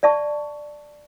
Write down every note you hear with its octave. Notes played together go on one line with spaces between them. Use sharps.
D5 E5 A5 C#6